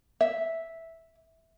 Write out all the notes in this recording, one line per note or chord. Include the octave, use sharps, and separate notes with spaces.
E5